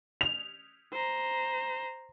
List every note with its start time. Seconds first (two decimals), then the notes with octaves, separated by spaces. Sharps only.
0.21 F7
0.92 C5 A#5